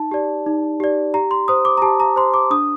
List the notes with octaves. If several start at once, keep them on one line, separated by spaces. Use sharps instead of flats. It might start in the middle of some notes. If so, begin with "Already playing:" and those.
Already playing: D#4 A5
G4 D5
D#4
G4 D5
G4 A#5
C6
C5 D#6
D6
A#5
G4 A5
A#5
C5 C6
D6
D4 D#6